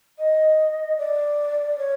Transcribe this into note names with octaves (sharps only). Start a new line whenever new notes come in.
D#5
D5
C#5